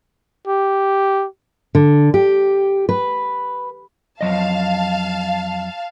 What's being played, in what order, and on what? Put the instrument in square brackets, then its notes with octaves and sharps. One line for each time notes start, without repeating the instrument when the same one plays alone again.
[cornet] G4
[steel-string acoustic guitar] D3
G4
B4
[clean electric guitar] F2 F#3 D#5 [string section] F5 A5